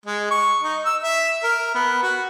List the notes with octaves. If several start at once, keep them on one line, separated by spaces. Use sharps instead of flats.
G#3
C#6
D#4
E6
E5
A#4
B3
F#4